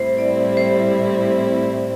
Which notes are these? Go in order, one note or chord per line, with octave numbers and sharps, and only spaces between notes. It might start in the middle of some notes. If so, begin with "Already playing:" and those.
Already playing: A2 G3 C4 E4 C5
D5
C5